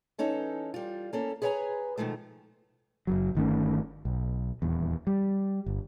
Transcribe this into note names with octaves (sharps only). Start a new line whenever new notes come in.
E3 C#4 D#4 A4
G3 F4
A#3 C#4 A4
G#4 B4 C#5 D5 G#5 A#5
B2 D#3 F3 G#3 A3
F#1 D#2 F#3
G1 D#3 A3 C#4
B1
D#1 E2
G3
G1